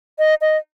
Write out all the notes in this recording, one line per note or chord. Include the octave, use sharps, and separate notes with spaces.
D#5
D#5